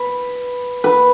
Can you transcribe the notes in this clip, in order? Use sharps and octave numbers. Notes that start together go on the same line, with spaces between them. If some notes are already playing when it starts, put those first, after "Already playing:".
Already playing: B4
B4